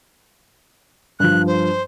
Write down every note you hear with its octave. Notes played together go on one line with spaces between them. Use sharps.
G2 F3 F#6
C5